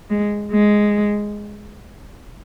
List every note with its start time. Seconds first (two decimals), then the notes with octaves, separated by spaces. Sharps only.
0.10 G#3
0.52 G#3